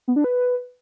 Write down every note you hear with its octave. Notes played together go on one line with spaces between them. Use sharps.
B3
D4
B4